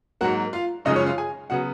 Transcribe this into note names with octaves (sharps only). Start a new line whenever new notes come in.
G#2 F#3 A#3 F#4 F#5
F4 F5
F#2 C#3 F3 G#3 D#4 D#5
C#4 C#5
F4 F5
G#4 G#5
C#3 F#3 B3 F#4 F#5